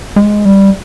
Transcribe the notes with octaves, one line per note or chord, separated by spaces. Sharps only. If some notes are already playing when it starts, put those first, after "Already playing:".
G#3
G3